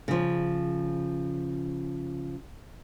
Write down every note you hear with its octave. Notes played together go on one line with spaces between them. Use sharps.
C#3 F3